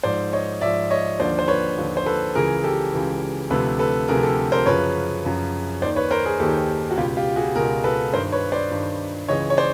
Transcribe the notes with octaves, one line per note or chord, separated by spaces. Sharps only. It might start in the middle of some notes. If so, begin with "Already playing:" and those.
G#2 F3 C5 D5
C#5 D#5
G#2 F3 D5 E5
C#5 D#5
D#2 D3 F3 C5 D5
C5
B4 C#5
D#2 D3 F3
C5
A4 B4
C#2 C#3 E3 G#4 A#4
G4 A4
C#2 C#3 E3
D2 C3 F3 A4 B4
A4 B4
D2 C3 F3 G#4 A#4
G4 A4
A#4 C5
F#2 C#3 F3 B4 C#5
F#2 C#3 F3
D#2 D#3 C5 D5
B4 C#5
A#4 C5
G#4 A#4
D#2 D#3 G4 A4
F#4
C#2 B2 F4 G4
F4 G4
F#4 G#4
C#2 B2 G#4 A#4
A4 B4
G2 D#3 A#4 C5
B4 C#5
C5 D5
G2 D#3
C#2 C#3 E3 C#5 D#5
C#5
C5 D5